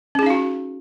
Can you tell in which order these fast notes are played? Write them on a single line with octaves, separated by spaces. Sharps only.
C#4 G#4 D#4 F5 F#4